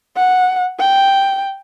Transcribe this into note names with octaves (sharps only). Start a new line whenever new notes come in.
F#5
G5